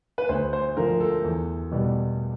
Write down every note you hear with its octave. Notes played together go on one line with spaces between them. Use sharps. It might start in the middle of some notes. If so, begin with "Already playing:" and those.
B4
D2 C5
C5
D3 F3 A#4
A4
E2
B2 G3